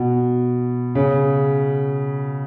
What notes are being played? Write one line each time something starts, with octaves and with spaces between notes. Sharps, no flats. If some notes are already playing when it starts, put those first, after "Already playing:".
Already playing: B2
C#3